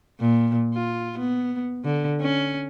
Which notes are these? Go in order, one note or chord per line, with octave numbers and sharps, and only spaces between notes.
A#2
F4
B3
D3
C#4